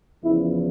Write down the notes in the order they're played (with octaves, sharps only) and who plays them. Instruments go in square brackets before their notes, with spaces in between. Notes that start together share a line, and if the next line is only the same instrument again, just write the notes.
[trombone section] E2 C#3 F3 E4